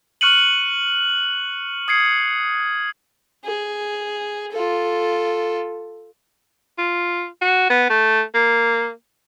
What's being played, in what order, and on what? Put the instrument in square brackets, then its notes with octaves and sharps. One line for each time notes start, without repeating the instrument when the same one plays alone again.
[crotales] C#6 F6 F#6 C#7 D#7 F#7
D#6 G#6 C7 C#7
[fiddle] G#4
F4 A4
[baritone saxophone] F4
F#4
B3
A3
A#3